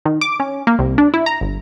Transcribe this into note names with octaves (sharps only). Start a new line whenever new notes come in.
D#3
D6
C#4
A#3
C2
D4
E4
A#5
G1